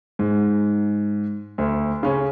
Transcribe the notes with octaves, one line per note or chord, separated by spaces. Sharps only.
G#2
D2
C#3 C#4